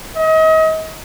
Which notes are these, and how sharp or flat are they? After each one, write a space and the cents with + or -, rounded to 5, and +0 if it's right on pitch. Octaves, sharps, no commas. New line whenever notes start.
D#5 +35